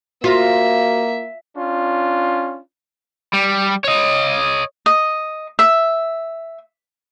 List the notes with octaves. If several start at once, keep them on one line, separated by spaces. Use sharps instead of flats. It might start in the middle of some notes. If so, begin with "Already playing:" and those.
A#3 F4 F#4 C5 E5 A#6
C#4 D4 F4
G3
C#5 D#5
D#5
E5